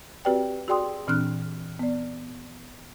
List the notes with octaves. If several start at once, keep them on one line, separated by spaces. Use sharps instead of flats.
C4 F#4 G4 B4 D5 G5
F#4 G#4 D5 G5 C6 D#6
A#2 E3 C4 D4 F6 F#6
B3 D5